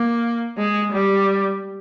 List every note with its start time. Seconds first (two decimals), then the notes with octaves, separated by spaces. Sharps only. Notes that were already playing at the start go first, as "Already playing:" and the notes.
Already playing: A#3
0.58 G#3
0.92 G3